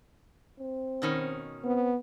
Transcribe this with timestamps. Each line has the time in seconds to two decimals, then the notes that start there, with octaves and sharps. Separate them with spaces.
0.60 C4
1.02 B2 D#3 C#4
1.64 B3 C4